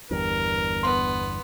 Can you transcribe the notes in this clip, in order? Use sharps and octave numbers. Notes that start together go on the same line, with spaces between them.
G1 E2 G2 A#4
B3 C6